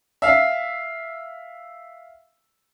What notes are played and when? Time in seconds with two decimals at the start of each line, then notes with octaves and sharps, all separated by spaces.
0.22 E5 F5